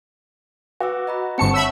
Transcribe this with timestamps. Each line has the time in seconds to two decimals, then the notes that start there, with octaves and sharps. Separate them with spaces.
0.80 F#4 B4 D6 E6
1.07 D#5 A#5 B5
1.38 G1 C4 F#5 A5 C#6 C#7
1.54 C#5 E5 B5 E6